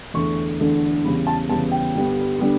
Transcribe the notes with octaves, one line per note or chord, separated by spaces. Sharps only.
E2 D3 A3 C#6
E2 D3 A3
E2 C#3 G3 B3 B5
A5
E2 C#3 G3 B3 A5
G5
G2 D3 G3 B3
D3 G3 B3